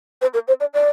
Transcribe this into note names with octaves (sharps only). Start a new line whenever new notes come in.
C5
A#4
C5
D5
D5